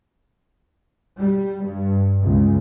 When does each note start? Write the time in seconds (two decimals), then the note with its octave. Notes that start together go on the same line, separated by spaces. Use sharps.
1.18 G3
1.63 G2
2.22 C#2